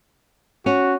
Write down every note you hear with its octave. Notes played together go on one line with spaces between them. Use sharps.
C#4 F#4